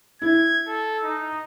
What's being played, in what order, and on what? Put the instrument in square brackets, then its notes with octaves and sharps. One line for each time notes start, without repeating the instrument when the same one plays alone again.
[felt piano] E4 [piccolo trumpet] G#6
[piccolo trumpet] A4
D#4